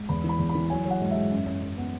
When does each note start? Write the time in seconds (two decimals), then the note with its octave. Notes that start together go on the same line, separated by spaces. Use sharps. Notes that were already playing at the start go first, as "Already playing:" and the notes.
Already playing: G#2
0.09 E2 B5
0.24 E3
0.29 B5
0.39 E2
0.49 B5
0.55 E3
0.70 F#3 G#5
0.85 F#3
0.91 F#5
1.01 G#2
1.11 E5
1.16 G#2
1.31 F#2
1.46 F#2
1.62 F#2
1.78 B3